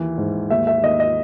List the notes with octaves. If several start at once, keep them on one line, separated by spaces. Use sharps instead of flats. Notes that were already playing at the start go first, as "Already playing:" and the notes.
Already playing: D#2 E3
G#2
D#2 E5
E5
D#2 D#5
D#5